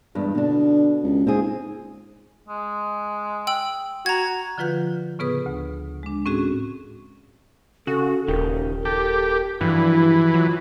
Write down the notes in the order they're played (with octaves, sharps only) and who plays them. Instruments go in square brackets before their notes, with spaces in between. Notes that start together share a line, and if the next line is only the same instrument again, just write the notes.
[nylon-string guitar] E2 G2 G#3
[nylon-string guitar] B2 D4 [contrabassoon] D3
[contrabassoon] C#2
[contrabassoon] G#2 [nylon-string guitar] C4 F4 G#4
[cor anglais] G#3
[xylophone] G5 E6 F#7
[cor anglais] F#4 [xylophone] A#5 G#6
[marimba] D3 F3 F4 B4 F#5 G6
A2 C#3 B3 G#4 B4 D#6
D2
G#3 D4
A2 C4 C#4 F#4 G#4
[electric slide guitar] C#3 [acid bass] F#4 [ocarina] A4
[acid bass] D#1 [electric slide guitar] C#3 D#4 G4 [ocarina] A#4
[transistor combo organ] G4 [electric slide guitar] A4
[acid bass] G2 [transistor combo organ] E3 [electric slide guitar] F3 F#4 [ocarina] E4
[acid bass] F#3 [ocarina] F4